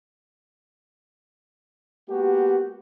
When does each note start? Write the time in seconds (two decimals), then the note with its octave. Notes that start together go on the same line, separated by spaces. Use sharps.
2.09 G#3 A#3 B3 F#4 G4